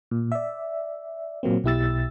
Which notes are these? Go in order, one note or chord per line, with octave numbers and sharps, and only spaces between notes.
A#2
D5 E5
A#2 F#3 A#3 C4
B1 B2 E4 G4 E6 A6